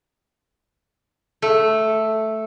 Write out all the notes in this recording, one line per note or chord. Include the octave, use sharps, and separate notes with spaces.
A3